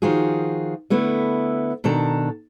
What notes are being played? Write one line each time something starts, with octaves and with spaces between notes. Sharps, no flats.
D#3 F3 F4 F#4 G#4
D3 A3 B3 E4
B2 D#3 D4 A4 A#5